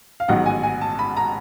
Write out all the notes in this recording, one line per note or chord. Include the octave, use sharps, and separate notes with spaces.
F5
A1 G#2 D#3 F#3 B3 F#5
G#5
G#5
A5
B5
A#5